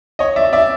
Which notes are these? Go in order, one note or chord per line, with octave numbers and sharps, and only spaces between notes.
C#5 D#5
D5 E5
D5 E5